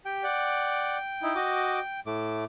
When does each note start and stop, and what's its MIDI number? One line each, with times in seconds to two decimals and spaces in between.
0.05 0.23 67
0.05 2.00 79
0.23 0.97 74
0.23 0.97 78
1.23 1.34 63
1.23 1.34 64
1.35 1.79 66
1.35 1.79 75
1.35 1.79 86
2.06 2.45 45
2.06 2.45 57
2.06 2.45 86